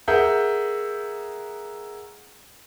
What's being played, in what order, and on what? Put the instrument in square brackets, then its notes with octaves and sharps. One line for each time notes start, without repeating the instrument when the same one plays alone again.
[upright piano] G#4 A#4 E5 F#5 G6